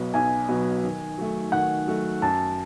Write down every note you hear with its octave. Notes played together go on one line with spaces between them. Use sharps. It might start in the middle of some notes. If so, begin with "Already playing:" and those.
Already playing: B1 B2 F#3 B3
B1 G#5
B2 F#3 B3
D#3
F#3 A3
D#3 F#5
F#3 A3
F#2 A5